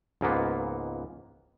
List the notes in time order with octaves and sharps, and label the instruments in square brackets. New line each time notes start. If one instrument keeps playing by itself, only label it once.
[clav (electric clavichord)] C#2 G#2 A#3 B3